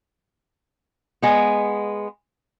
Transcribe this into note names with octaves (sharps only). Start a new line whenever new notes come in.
G#3 B3